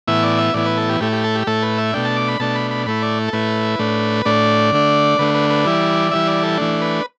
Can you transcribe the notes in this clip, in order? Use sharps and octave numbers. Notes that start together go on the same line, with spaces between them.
A2 E3 B3 E4 E5
D5
E5
A2 E3 B3 E4 D5
B4
A4
G4
A2 A3 E4 G4
G4
A4
G4
A2 A3 E4 A4
B4
E5
B2 A3 D4 G5
A5
D6
B5
B2 A3 D4 A5
B5
B5
A2 A3 E4 B5
D5
A4
A2 A3 E4 B4
A2 A3 D4
A2 A3 D4 D5
D3 A3 D4
D3 A3 D4 B4
B4
B4
E3 G3 E4 D5
E3 G3 E4 E5
D5
A4
E3 A3 D4
B4